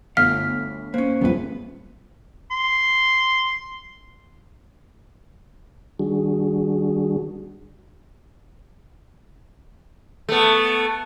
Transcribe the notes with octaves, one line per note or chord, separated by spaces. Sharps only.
G1 D2 F5 F6 B6
A#3 C#4 C5
F#1 C#2 G2 B3 B4
C6
D#3 G3 D4 F#4 G#4
A3 B3